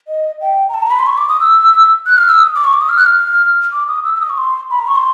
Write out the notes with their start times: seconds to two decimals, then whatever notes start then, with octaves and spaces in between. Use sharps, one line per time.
0.08 D#5
0.41 G5
0.69 A#5
0.74 A5
0.82 A#5
0.91 B5
0.99 C6
1.07 C#6
1.18 D6
1.29 D#6
1.40 E6
2.06 F#6
2.17 F6
2.28 E6
2.39 D#6
2.56 D6
2.64 C#6
2.73 D6
2.81 D#6
2.89 F6
2.97 F#6
3.06 F6
3.72 D6
3.88 D#6
4.04 E6
4.15 E6
4.21 D#6
4.30 C#6
4.37 C6
4.70 B5
4.79 A#5
4.87 C#6
4.96 C6